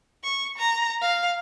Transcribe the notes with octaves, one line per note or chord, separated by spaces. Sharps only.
C#6
A#5
F5